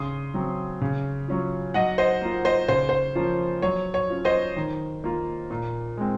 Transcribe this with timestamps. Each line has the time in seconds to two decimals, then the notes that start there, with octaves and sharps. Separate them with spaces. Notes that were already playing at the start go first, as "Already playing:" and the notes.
Already playing: C#3 C6 D#6
0.34 F#3 C4
0.81 C#3
1.28 F#3 C#4 F4
1.74 F#3 D#5 F#5
1.98 C5 D#5
2.22 A#3 F4
2.45 C5 D#5
2.68 C#3 C5
2.89 C5
3.15 F3 A#3 C#4 F4
3.62 F#3 C#5
3.94 C#5
4.10 C#4 F4
4.25 C5 D#5
4.56 D#3
5.04 A#3 F4
5.50 A#2
5.97 G#3 C4